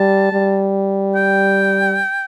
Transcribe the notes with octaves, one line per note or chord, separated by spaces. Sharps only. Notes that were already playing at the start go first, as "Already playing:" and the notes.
Already playing: G3 A5
G3
G5